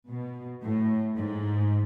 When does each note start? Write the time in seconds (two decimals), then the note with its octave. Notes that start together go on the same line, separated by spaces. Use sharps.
0.09 B2
0.63 A2
1.17 G#2